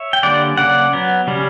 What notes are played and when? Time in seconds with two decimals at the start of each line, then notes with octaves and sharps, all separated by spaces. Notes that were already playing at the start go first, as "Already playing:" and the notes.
Already playing: C#5 E5
0.13 G5
0.23 D3 G3 A#3 C#4 D5 F#5
0.57 C#3 F#3 A#3 C#4 D5 F#5
0.93 F#3 B3
1.27 C#3 G3 C#4